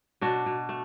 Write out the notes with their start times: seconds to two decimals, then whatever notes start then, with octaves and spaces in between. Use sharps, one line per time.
0.21 B2 D4 F#4
0.46 B2
0.69 A3